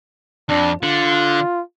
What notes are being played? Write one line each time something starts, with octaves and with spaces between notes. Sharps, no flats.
F2 D4
D3 F4